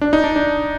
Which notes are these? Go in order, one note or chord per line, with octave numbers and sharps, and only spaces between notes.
D4
D#4
D4
D4